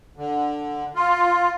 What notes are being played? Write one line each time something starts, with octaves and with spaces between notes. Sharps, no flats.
D3
F4